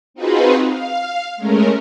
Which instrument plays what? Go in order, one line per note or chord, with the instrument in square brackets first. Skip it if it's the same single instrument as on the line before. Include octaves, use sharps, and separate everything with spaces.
[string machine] C4 D#4 F4 F#4 G#4 B4
F5
G#3 A3 C#4 A#4